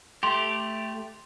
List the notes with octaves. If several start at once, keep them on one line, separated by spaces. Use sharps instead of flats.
A3 G4 C6 F7